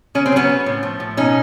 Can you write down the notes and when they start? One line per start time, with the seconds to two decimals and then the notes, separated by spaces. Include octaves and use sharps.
0.15 C#3 C#4
0.26 C4
0.32 F#3 B3 C#4
0.49 C#3
0.66 A2
0.83 F3
1.00 A2
1.17 B2 C#4 D#4